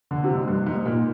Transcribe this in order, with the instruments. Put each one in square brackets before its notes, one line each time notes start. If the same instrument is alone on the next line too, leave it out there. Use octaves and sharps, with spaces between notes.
[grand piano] D3
C3
G#2
G2
G#2
A#2